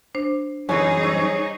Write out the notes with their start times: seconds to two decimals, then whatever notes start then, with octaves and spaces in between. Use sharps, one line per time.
0.15 D4 C5
0.69 F#2 E3 G3 D#4 G#4 C#5 G#5
1.03 C5 C#5 E6